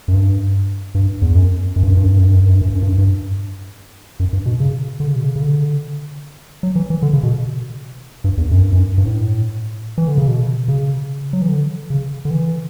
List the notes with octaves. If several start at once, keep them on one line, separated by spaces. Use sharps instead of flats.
F#2
G2
G2
E2
F#2
F#2
G2
F#2
G2
F#2
G2
F#2
G2
F#2
G2
F#2
G2
F#2
G2
F#2
G2
F#2
G2
F#2
G2
B2
C#3
D3
C#3
B2
C#3
C#3
D3
F#3
E3
E3
D3
C#3
B2
G2
E2
F#2
G2
F#2
G2
A2
E3
D3
C#3
B2
C#3
F#3
E3
D3
C#3
D3
E3